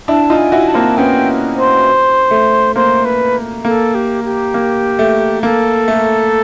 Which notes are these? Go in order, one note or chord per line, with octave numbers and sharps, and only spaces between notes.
D4 E4 A5
D#4 F4
G#5
E4 F#4
A5
A#3 C4
B3 C#4 G5
C5
A3
A#3 C5
B4
A#3 A4
G4
G4
A#3
A3
A#3 A4
A3